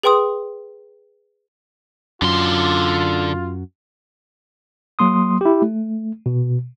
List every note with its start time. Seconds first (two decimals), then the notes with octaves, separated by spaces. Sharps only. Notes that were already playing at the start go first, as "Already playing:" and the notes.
0.03 G#4 B4 G5 C6 D#6
2.22 F#2 D3 F4 C6
4.99 F#3 A#3 C6 D#6
5.41 E4 G4
5.62 A3
6.26 B2